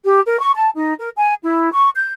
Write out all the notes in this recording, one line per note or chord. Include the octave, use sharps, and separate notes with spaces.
G4
A#4
C#6
A5
D#4
A#4
G#5
E4
C#6
G6